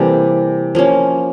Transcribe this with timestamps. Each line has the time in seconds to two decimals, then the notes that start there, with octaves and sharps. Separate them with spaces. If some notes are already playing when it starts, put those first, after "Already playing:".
Already playing: C3 E3 G3 A#3 G4 A4
0.75 F3 A#3 C#4